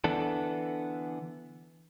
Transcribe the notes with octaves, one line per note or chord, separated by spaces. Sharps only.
D3 E3 B3 D4 A4